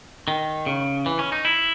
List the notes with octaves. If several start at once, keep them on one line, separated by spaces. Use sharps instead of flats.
D#3
C#3
E3
C#4
D#4
E4